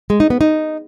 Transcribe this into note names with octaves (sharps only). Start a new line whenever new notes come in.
G#3
D#4
B3
D#4